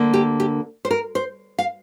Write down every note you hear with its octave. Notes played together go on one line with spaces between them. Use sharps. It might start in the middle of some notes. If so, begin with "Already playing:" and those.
Already playing: D2 D3 A#3
G4
G4
C5
A#4
C5
F5